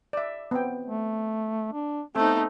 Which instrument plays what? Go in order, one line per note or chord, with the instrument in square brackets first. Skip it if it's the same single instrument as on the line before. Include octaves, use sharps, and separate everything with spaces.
[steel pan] D5 E5
B3 C4 G5
[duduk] A3
D4
[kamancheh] A3 D#4 [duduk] B3 [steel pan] C4